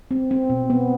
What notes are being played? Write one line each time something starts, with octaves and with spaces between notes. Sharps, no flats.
C4
C4
B2
B3